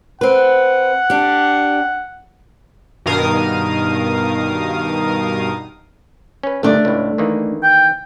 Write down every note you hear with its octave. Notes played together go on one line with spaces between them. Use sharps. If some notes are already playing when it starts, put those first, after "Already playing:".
C4 B4 F#5
D4 G4
G2 B2 D#3 A#4 F5 D#6
C#4 B4
G1 D#3 A3 D4
C#2 A2
D#3 E3 A#3
G5